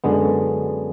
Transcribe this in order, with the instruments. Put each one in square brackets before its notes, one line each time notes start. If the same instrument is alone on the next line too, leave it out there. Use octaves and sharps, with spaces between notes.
[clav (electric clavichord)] F#2 D3 G#3 B3